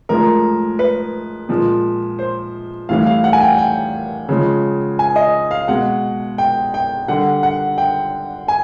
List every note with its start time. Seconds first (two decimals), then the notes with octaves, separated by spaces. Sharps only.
0.09 A2 F3 G#3 A#4
0.79 B4
1.49 A#2 F3 G#3
2.19 C5
2.89 A2 E3 G3 F5
3.06 F5
3.24 F#5
3.33 G#5
3.41 G5
3.58 G5
4.29 C#3 F3 G#3
4.99 G#5
5.16 D#5
5.51 F5
5.68 B2 G#3 F#5
6.38 G5
6.74 G5
7.08 D3 G3 F#5
7.43 F#5
7.78 G5
8.48 G#5